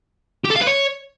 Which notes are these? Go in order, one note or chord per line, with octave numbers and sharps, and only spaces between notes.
G4
A4
F5
B4
C#5